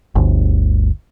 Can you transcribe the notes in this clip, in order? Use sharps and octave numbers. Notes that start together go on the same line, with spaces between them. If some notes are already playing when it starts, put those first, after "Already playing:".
G1 D2